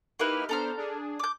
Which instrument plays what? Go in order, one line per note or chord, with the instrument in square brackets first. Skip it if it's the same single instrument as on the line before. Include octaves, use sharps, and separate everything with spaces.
[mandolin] A#3 E4 B4 [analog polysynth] D#4 G4 F6
[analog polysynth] B3 D4 C5 [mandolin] A4 A#5 F6
[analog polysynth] D4 G#4
[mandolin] D6 G6